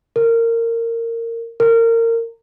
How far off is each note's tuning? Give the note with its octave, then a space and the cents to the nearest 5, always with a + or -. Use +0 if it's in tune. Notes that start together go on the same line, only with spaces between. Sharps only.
A#4 -20
A#4 -25